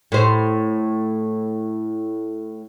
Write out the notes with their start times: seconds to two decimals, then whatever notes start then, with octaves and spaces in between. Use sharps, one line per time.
0.12 A2 C5